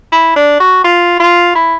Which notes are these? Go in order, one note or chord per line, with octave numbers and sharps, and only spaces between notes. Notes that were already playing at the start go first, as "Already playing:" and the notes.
E4
D4
F#4
F4
F4
E4